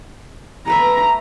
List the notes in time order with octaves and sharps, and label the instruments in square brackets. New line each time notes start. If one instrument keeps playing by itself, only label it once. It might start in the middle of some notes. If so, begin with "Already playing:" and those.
[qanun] A3 B4 E5 [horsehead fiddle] A#5